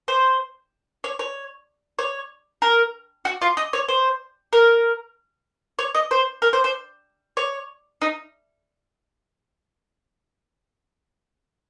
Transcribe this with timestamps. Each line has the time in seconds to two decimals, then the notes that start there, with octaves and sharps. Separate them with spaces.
0.08 C5
1.04 C#5
1.19 C#5
1.99 C#5
2.62 A#4
3.25 F#4
3.42 F4
3.57 D#5
3.73 C#5
3.88 C5
4.53 A#4
5.79 C#5
5.95 D#5
6.11 C5
6.42 A#4
6.53 C5
6.64 C5
7.37 C#5
8.02 D#4